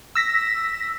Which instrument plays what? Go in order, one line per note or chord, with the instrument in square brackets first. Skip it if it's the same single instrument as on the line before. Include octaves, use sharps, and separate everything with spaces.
[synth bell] E6 A#6 B6